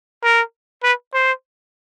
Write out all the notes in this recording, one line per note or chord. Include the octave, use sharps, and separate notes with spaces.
A#4
B4
C5